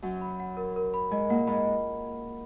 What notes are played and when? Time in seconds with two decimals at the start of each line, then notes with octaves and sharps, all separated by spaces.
0.02 F#2 F#3 F#5
0.21 B5
0.40 F#5
0.57 A#4
0.76 A#4
0.94 B5
1.11 G#2 G#3 D#5
1.29 A#2 A#3 F#5
1.47 G#2 G#3 B5